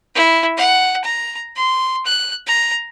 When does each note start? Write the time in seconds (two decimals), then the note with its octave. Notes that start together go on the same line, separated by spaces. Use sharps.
0.15 E4
0.57 F#5
1.04 A#5
1.56 C6
2.06 F#6
2.47 A#5